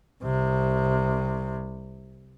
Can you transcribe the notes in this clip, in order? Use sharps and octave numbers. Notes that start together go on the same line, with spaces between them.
C2 C3